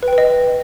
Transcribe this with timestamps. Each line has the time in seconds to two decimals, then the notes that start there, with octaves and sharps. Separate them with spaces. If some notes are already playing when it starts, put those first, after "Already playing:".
0.03 B4
0.08 G5
0.13 B4
0.18 D#5